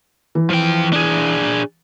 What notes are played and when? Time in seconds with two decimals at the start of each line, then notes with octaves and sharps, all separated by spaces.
0.35 E3
0.50 F3 G5
0.93 D4 G#4